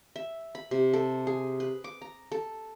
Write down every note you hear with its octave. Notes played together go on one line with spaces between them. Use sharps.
E5
B5
C3
A4
G#4
B4
D6
A#5
A4